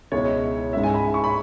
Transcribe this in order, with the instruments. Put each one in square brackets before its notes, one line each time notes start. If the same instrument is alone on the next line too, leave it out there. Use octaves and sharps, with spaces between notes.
[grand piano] C#2 B2 G#3 E4 [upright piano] C#5
[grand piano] G#2 G#3 C#4 [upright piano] E5
[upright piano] G#5
B5
C#6
B5